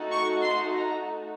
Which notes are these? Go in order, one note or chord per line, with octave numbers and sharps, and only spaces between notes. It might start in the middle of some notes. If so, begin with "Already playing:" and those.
Already playing: A3 D#4 F#4 A4
C#6
C6
A#5